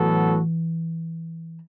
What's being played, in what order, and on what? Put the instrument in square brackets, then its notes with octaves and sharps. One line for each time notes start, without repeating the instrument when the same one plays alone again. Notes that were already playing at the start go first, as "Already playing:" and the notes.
Already playing: [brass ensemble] A2 F#3 B3 F#4 A4 [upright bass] E3